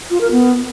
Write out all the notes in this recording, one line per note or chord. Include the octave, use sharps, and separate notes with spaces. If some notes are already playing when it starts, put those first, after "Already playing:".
F4
A#4
B3